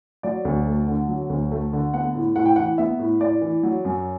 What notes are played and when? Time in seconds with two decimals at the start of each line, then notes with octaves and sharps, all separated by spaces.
0.23 F#3 D5
0.45 D2
0.66 A3
0.88 D3
1.09 F#3
1.30 D2
1.51 A3
1.73 D3
1.94 B3 F#5
2.15 A2
2.36 A2 F#5
2.45 G5
2.56 E3 F#5
2.78 B3 E5
2.99 A2
3.20 A2 D5
3.41 E3
3.63 F#3
3.85 F#2